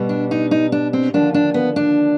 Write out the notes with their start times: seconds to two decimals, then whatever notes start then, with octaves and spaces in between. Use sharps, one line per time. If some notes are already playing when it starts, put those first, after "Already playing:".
Already playing: B2 G3
0.09 D4
0.31 D#4
0.51 D#4
0.72 D4
0.93 C4
1.14 D#2 D3 F3 D4
1.34 D4
1.54 B3
1.76 D4